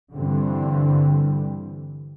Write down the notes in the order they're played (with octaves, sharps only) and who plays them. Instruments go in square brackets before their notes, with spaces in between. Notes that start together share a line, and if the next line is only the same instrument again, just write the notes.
[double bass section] G2 D3 E3 G3 C4